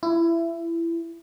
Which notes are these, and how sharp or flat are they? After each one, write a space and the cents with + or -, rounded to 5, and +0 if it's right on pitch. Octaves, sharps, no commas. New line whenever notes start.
E4 +20